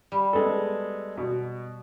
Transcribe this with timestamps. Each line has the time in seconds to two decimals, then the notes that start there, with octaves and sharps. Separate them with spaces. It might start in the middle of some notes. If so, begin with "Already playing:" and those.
0.12 G3
0.33 G#3 B3 A4
1.17 B2